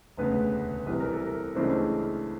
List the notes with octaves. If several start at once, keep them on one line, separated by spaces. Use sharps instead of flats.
E1 D2 C#3 B3 B4
C2 C3 E3 B4
A#4
A4
A#4
C#2 C#3 E3 A3 C4 D4 C5